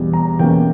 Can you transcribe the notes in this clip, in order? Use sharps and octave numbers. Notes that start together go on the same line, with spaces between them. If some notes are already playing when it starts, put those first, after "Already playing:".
Already playing: E2 B2 G3
A#5
E2 B2 A#3 C#4 G5